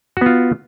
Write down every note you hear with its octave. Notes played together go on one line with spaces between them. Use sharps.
B3 F4 F#4